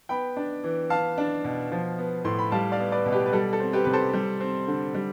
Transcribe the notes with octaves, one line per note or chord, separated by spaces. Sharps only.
B3 G5 B5
D4
E3
B3 F5 A5
D4
B2
F3
B3
A2 C6
B5
G3 F5 A5
D5 F5
B3
B4 D5
B2
G4 B4
B4
G3 A4
A4
C4
G4 B4
C3 B4
A4 C5
G3
C4
D3
G3